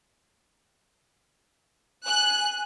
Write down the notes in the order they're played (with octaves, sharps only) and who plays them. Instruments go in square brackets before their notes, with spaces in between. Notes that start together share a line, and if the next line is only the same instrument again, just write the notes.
[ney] G#5 [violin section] F#6